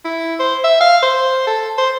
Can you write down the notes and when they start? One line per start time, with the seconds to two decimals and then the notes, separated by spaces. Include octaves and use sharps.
0.05 E4
0.39 C5
0.64 E5
0.81 F5
1.02 C5
1.47 A4
1.78 C5